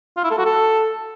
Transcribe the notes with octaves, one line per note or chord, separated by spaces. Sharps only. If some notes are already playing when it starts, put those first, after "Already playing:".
F4
E4
A4
F#4
A4